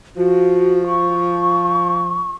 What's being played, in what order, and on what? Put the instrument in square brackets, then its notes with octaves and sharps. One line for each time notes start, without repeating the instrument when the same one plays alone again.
[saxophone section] F3 [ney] F#4
[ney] C#6